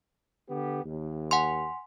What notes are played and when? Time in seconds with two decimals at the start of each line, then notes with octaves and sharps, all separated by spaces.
0.49 D3 B3 G4
0.83 D#2
1.31 F#5 G#5 C6